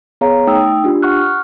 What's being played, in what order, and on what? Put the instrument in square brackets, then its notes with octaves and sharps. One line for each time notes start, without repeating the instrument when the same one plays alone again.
[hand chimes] B3 G#4 C#5 F5 A#5
A3 D#4 G5 D#6 E6
D4 F4 G4
F#5 C#6 F6 F#6
F6